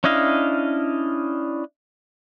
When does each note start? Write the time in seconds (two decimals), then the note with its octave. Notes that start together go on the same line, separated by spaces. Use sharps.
0.04 C#4 D4 E4 D#5 F5